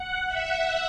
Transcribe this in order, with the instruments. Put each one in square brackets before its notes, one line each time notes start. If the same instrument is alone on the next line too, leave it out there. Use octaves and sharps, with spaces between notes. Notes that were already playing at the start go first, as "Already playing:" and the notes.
Already playing: [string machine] F#5
E5